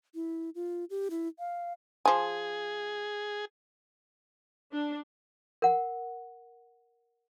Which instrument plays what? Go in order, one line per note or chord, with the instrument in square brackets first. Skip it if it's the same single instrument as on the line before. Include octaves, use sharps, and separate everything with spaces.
[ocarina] E4
F4
G4
E4
F5
[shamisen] F3 G#5 [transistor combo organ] G#4
[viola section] D4
[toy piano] A#4 F#5